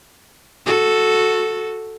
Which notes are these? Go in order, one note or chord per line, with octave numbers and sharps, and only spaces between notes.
F#4 A4